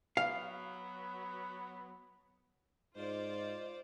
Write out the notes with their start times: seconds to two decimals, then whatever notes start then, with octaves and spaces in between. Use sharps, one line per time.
0.17 F#3 B3 F5
2.96 G#2 F4 C5 D5 D#5